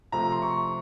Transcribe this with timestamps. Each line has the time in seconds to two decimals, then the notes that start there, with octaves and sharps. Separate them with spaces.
0.12 C3 F3 A3 C4 A#5
0.32 C6
0.42 C#6